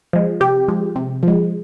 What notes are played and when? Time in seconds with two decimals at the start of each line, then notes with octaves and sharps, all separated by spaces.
0.13 F3 G#3
0.40 C3 G4
0.68 F3 G#3
0.96 C3
1.23 F3 G#3